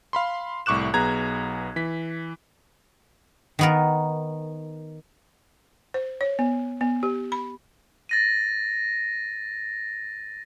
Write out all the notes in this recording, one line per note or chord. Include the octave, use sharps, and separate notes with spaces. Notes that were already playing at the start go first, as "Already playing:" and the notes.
F5 B5 C6
C2 A2 C#6 D6 F#6 E7
B1 B3 G#4 A#5 G#6
E3 B6
D#3 B3 A#4
C5
C#5
B3
B3
G4
B5
A6 A#6 D#7